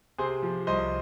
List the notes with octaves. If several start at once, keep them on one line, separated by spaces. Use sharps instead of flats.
C3 G#4 C5
F3
C2 C5 D#5